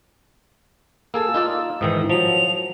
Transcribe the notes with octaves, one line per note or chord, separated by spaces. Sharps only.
A#3 G#4 A4 E6
D#4 F4 D5
G#2 D#3 E3 D#6
F3 F#3 F7